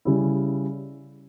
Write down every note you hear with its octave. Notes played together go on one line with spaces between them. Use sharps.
C#3 G3 C#4 E4